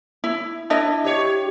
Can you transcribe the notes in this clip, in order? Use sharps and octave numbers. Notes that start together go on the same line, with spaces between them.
E4
D4 E4 D#5
G4 C#5